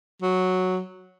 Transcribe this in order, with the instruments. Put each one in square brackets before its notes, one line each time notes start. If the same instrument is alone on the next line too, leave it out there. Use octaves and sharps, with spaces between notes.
[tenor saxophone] F#3